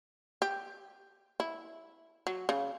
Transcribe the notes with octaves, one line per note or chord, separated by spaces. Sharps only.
G4
E4
F#3
C#3